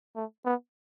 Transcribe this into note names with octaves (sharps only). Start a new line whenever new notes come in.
A3
B3